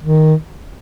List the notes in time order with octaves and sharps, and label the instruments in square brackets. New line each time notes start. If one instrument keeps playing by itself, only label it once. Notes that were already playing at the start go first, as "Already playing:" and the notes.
[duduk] D#3